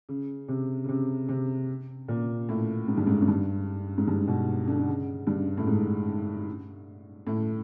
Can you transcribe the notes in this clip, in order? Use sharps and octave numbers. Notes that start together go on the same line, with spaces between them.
C#3
C3
C#3
C3
C3
A#2
A2
G#2
G2
G#2
G#2
G2
G#2
G2
B2
D3
D3
C#3
G2
A2
G#2
A2